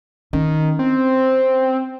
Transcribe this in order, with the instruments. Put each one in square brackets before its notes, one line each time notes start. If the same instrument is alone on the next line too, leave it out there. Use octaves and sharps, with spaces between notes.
[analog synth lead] D#3 [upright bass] C#4
[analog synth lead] C4